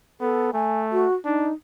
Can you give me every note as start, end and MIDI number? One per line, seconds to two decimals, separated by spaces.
0.21 0.53 59
0.21 0.54 69
0.54 1.06 57
0.54 0.79 80
0.92 1.14 66
1.25 1.50 62
1.25 1.52 63